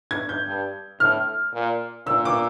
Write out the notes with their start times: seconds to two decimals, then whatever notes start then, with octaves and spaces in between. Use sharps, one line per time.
0.11 G#6
0.29 G6
0.46 G2
1.00 A2 F6
1.54 A#2
2.07 A#2 E6
2.25 D6